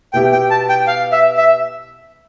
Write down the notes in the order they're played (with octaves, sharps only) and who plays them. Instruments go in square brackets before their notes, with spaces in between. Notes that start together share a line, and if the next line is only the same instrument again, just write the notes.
[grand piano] B2 B3 E4 G4 [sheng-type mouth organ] G5
[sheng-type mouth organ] G5
A5
G5
F5
E5
E5